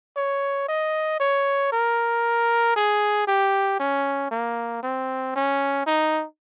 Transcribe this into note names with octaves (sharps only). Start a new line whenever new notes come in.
C#5
D#5
C#5
A#4
G#4
G4
C#4
A#3
C4
C#4
D#4